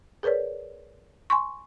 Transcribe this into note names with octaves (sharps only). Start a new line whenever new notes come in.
G#4 A#4 B4 C#5 D5
G#5 C6 C#6